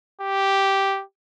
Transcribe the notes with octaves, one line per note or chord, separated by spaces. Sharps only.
G4